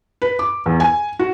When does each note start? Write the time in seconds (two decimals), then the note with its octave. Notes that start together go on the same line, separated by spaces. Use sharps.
0.22 B4
0.39 D6
0.66 E2
0.80 G#5
1.19 F#4